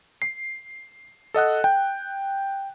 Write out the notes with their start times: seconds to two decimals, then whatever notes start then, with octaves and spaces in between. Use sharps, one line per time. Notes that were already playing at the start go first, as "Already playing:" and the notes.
0.22 C7
1.34 A4 D#5 F#5 F#6
1.64 G5